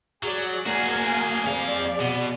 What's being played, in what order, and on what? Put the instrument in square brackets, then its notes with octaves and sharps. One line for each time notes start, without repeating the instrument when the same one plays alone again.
[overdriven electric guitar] F#3 [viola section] G#4 D5
[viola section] A#3 F5 G#5 [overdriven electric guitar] F#4 G#4
[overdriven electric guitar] F2 F5 [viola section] G#4 D5
[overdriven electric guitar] B2